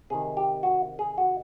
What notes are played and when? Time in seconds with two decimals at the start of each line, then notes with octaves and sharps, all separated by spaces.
0.10 C3 D#3 G#4
0.37 G4
0.63 F#4
0.99 G#4
1.18 F#4